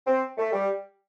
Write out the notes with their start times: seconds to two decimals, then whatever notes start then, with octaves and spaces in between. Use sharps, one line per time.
0.07 C4
0.38 A3
0.53 G3